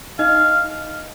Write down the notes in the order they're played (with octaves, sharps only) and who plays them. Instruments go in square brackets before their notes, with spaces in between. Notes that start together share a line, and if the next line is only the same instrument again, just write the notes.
[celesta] D#4 D#5 [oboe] F5